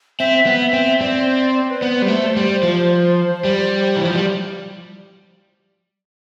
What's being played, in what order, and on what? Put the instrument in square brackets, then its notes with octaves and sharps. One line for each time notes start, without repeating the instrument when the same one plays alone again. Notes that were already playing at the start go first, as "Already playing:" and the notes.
[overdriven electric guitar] C4 [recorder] E5
[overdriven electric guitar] B3
[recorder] E5
[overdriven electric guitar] C4
[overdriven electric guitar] C4 [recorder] D5
[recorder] B4
[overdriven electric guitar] B3 [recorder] C5
[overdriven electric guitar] G3
A3
G3
F3
G3
E3
F3
G3